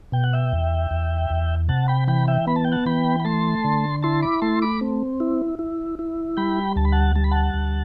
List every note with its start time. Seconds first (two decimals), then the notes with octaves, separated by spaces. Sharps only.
0.12 B2 G5
0.24 F#5
0.33 E5 G5
0.52 E2
0.91 E2
1.30 E2
1.69 C3 F#5 A5
1.88 G5 B5
2.07 E3 G5 B5
2.28 E5 G5
2.47 B3 B5
2.56 A5
2.64 G5
2.72 F#5 A5
2.86 E3 G5 B5
3.20 B5
3.25 A3 A5 C6
3.64 D3
4.03 E4 A5 C6
4.22 B5 D6
4.42 A3 A5 C6
4.62 B5 D6
4.81 C4
5.20 E4
5.59 E4
5.99 E4
6.37 G3 G5 B5
6.76 D2 A5
6.85 B5
6.92 F#5 A5
7.15 G3 A5
7.24 B5
7.31 F#5 A5
7.54 D2